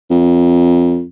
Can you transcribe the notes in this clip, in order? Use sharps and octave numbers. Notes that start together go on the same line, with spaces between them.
F2